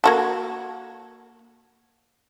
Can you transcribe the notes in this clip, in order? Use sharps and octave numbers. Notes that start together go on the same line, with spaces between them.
A#3 F#4 A4